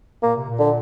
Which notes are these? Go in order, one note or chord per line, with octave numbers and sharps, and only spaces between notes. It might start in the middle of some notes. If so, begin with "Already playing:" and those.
A#2 A#3
C3
A#2
D3